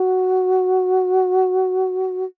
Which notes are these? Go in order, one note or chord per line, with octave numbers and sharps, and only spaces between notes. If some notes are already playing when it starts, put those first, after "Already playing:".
Already playing: F#4